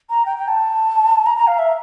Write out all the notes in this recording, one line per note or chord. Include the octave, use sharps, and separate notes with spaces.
A#5
G5
G5
A5
A#5
A#5
F5
E5